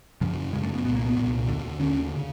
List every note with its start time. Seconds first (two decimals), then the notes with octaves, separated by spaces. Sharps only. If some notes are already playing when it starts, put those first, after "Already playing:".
0.21 F#2 C#3 F3
0.53 C#3 G#3
0.56 F#2
0.63 A3
0.74 B3
0.85 A#2 B3
0.89 C2
0.95 A#3
1.06 B3
1.16 C2 A#2
1.48 D#2 D3
1.79 D#2 D3 C#4
2.16 C#3